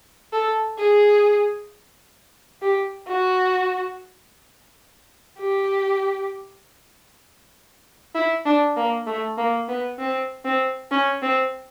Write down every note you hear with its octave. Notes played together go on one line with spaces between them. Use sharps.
A4
G#4
G4
F#4
G4
E4
D4
A#3
A3
A#3
B3
C4
C4
C#4
C4